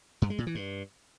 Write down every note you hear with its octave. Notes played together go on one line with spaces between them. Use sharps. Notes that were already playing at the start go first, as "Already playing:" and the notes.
G2
G#3
A#2
E3
G2